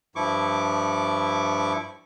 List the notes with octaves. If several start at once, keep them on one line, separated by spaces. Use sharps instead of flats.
G2 F3 E4 C#6 D6